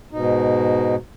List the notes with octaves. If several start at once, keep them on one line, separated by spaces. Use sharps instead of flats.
G#2 B2 D#4